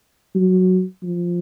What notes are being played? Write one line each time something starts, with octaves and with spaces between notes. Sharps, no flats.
F#3
F3